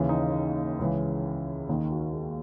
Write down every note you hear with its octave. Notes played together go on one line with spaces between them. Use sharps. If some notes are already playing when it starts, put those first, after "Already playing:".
Already playing: D#2 C#3 E3
D#4
C#2 C#3 E3
D#2 D#3 D#4
F#4
G#4